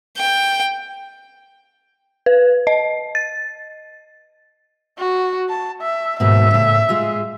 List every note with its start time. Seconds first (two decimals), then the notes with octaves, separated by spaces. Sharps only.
0.17 G5
2.26 B4
2.67 D#5
3.15 A6
4.99 F#4
5.49 A5
5.82 E5
6.20 D#2 G#2 B2 E5
6.51 A2 C#3
6.89 G#3 F4 G#4